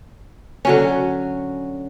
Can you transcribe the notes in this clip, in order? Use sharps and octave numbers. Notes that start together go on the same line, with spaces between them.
D3 F#3 C#4